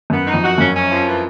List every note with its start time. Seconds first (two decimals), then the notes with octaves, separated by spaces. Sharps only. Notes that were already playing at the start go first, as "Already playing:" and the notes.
0.10 F#2 B3
0.26 D#4
0.34 F2
0.42 F#4
0.58 F#2 C#4
0.74 C#4
0.90 F3
1.06 E3